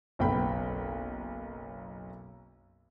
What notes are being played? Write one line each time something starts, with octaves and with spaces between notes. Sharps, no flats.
F#1 B1 B3 G5 B5